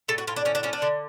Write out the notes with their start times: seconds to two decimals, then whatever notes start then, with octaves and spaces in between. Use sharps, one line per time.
0.08 A2 A4
0.18 F#4
0.27 A2 F4
0.36 D4
0.45 D3 C#4
0.55 D4
0.63 F3 C#4
0.73 D4
0.82 D3